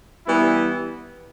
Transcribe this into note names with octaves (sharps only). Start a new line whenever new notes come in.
E3 G3 B3 E4